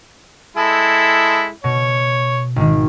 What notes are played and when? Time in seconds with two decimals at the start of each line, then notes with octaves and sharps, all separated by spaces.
0.57 G#3 E4 A4
1.64 B2 C#5
2.56 G#1 D#3